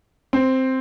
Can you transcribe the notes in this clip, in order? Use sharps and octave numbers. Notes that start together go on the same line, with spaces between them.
C4